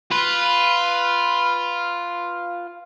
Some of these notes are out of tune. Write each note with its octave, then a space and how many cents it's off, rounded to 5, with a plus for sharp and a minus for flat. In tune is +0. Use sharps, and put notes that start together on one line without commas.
F4 +0 B4 +0